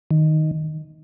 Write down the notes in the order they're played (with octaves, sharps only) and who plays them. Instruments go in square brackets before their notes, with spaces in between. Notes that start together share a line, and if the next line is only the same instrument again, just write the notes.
[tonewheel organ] D#3